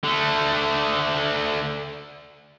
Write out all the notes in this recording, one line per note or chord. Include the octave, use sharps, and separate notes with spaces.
D3 A3